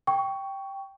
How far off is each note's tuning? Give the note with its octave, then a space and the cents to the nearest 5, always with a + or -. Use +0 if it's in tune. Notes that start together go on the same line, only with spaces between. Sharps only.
G5 +0 C#6 +15